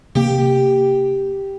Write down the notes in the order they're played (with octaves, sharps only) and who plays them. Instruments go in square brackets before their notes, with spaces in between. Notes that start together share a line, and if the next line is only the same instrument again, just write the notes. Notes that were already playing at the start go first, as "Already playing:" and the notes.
[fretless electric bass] C3 A#3 [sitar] G4